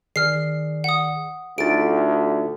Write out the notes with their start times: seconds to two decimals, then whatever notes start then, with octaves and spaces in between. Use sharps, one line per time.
0.16 D#3 G#4 D5 F6 C7
0.84 F#5 D#6
1.58 D2 D#4 F4 G#4 A6 D7